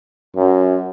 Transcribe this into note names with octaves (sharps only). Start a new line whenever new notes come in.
F#2